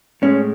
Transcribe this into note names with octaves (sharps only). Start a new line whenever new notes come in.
A2 G#3 C#4